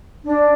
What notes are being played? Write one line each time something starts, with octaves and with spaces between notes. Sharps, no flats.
D4